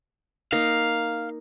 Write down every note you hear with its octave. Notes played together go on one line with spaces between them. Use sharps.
A#3 D#4 F5